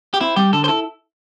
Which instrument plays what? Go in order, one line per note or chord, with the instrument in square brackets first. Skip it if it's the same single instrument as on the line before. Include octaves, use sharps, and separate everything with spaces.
[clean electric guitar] G4
[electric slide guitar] C4 [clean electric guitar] E4
[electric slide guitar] G3 [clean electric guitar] G4
[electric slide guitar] D3 [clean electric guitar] A4
[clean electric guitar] C5
[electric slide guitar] E4 [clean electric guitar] A4